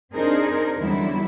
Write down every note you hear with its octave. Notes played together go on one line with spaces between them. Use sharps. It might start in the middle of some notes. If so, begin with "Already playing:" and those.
C4 D4 D#4 G#4 A#4 C5
E2 D3 F#3 G3 E4